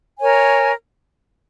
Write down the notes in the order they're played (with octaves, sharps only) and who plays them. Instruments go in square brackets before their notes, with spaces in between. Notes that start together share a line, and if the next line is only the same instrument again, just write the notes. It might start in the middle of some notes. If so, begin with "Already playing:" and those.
[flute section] A#4 C#5 G#5